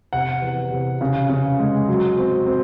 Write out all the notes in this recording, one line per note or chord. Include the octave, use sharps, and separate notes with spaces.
C3 F#5
E2
C3
C#3
C#3
G#3
F#3
C4
C4